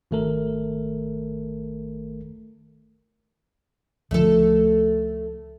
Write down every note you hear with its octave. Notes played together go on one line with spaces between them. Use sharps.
G#1 D#3 A3 A4 A#4
C#2 D3 F3 A3 A4